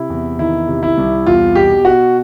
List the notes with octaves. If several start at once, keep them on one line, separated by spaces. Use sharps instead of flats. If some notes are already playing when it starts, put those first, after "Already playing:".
Already playing: C3 E4
E2
D#3 E4
C3
E4
C2
E2 F4
B2 G4
B2 F#4